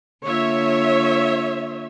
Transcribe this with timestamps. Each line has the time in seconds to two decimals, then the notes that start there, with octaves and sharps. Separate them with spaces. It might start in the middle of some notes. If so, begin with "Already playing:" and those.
0.24 D3 A#3 F4 C#5 E5